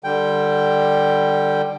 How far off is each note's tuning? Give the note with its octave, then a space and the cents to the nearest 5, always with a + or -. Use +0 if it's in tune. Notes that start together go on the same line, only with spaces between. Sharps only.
D3 +25 G3 +0 G5 +0